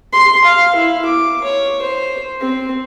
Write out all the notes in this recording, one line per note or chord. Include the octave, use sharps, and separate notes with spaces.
C6
F5
E4
D6
C#5
C5
C4